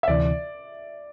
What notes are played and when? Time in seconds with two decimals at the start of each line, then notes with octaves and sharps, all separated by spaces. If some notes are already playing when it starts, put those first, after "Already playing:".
0.03 E5
0.08 D2 C3 E3 D5